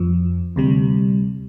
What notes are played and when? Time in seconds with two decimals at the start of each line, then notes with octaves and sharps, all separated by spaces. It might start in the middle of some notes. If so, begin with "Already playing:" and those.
Already playing: F2 F3
0.56 D2 C3 G3